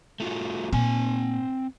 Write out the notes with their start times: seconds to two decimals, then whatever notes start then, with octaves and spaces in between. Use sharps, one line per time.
0.20 A3 F4 F#4
0.73 A#2 C4 G#5